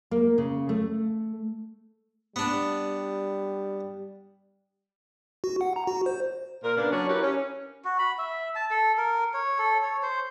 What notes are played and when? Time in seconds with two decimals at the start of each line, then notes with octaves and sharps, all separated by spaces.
0.11 A#3
0.38 C#3
0.69 A3
2.36 G3 B3 D4
5.44 F#4
5.61 F#5
5.76 A#5
5.87 F#4
6.06 C5
6.64 A#2 A#4
6.77 C#3 A#3 B3 D4
6.92 F#3 C#4 D4 C#5
7.09 E4 G4 A#4 B4 C#5
7.23 C#4
7.85 F#4
7.99 B5
8.18 E5
8.55 A5
8.71 A4
8.98 A#4
9.34 C#5
9.58 A4
9.83 C#5
10.03 C5